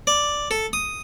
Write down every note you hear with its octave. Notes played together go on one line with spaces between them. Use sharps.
D5
A4
D#6